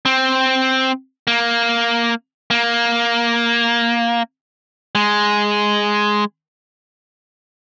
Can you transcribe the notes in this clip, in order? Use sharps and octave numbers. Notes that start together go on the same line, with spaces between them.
C4
A#3
A#3
G#3